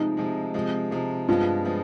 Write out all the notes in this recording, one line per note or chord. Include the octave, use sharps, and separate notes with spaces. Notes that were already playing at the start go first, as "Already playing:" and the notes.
Already playing: C3 F3 G#3 D#4
C3 F3 G#3
C3 F3 G#3
C3 F3 G#3
G2 F3 G#3 B3 F4
F3 G#3 B3